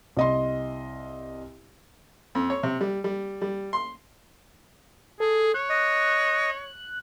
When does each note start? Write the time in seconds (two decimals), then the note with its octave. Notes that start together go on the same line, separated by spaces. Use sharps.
0.17 C2 D#5 C6
2.35 F2
2.50 C#5
2.63 C3
2.81 G3
3.04 G3
3.42 G3
3.73 C6
5.20 G#4 A4
5.54 C#5 F#6
5.70 D#5